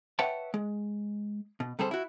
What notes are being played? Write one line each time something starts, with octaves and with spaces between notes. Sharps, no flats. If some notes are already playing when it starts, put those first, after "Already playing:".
B4 C#5 E5 F#5 G5 A5
G#3
B2
C3 G3 G#4 A4 C5
E4 F#4